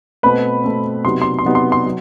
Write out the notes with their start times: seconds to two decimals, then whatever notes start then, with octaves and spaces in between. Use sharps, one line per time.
0.23 B2 A3 C4 B4 B5
0.64 B2 A3 C4
1.05 C3 F#3 B3 D#4 C6
1.22 C6
1.39 C6
1.45 C3 F#3 B3 D#4
1.55 C6
1.72 C6
1.85 F#3